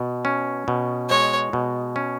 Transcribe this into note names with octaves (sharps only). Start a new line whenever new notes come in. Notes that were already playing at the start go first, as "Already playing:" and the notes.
Already playing: B2
C#4
B2
G#3 C#5
B2
C#4